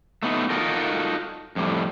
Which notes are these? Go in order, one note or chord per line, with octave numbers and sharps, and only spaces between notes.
A3 B3 D#4
D#4 F4 F#4 A4 A#4
F2 A2 G3